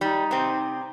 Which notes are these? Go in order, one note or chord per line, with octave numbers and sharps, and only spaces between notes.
G3 D#4
C3 C4